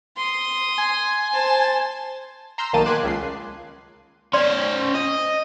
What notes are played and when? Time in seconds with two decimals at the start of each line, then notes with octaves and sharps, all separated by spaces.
0.17 C6 D#6
0.78 G#5
1.33 C5 A5
2.58 A#5 C6 E6 F6 G6
2.73 B1 D#3 A#3 A5 A6 D#7
2.86 G#5 B5 C6 D6 F#6
3.03 C#2 C#3 C7
4.33 C#4 C5 D5 C6
4.95 D#5